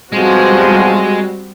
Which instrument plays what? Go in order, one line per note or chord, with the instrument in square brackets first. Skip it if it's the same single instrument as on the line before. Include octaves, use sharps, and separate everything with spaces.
[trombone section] B1 F3 [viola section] G3 C4 F#4 [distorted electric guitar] G#3